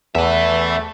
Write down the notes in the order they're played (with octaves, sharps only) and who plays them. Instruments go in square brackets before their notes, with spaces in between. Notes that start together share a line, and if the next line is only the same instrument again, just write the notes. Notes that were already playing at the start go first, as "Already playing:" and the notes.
[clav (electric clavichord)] E2 [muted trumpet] A3 [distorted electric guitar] B4 E5